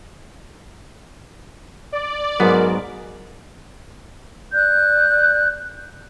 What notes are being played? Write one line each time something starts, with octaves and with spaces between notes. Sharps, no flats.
D5
G#2 F#3 B3 A#4
D5 F#6 G6